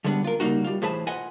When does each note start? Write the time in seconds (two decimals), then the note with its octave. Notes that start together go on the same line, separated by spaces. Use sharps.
0.04 D3 G3 G#3 B3 C#4 D4
0.24 F4 A#4
0.40 C#3 G3 A#3 D#4 F#4
0.64 G3 F4
0.82 A2 E3 G#4 B4 C5 A5
1.07 F4 B4 D#5 F#5 G#5